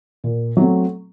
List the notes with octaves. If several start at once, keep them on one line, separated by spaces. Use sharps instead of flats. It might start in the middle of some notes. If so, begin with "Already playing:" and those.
A#2
F#3 A3 C4